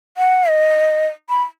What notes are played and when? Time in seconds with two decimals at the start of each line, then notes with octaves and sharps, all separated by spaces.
0.17 F#5
0.49 D#5
1.29 B5